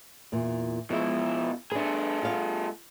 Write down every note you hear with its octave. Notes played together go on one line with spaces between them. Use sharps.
E2 A#2
B2 F3 G#3 E4
A3 D4 G#4 B4
F4 F5 F#5